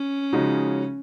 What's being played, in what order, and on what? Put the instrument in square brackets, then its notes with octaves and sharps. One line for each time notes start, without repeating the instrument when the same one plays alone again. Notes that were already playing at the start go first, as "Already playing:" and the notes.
Already playing: [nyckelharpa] C#4
[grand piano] C#3 F3 G#3 D#4 F#4